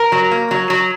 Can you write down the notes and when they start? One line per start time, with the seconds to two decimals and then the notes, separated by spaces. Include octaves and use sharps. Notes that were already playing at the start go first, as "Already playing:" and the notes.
Already playing: A#4
0.12 F#3
0.31 A#3
0.51 F#3
0.70 F#3